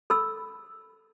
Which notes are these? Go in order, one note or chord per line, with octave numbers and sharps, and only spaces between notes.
A4 B5 E6